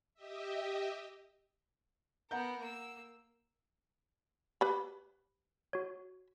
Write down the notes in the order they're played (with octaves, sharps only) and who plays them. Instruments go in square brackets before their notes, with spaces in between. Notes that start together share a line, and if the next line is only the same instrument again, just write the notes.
[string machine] G4 D#5 E5
[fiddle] B3 A#4 [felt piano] F#5 A#5 G6
[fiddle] A#3 E6
[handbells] G4 [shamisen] B4 B5
[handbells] F#4 C#5